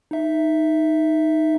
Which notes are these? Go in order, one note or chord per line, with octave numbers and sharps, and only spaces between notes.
D#4 E5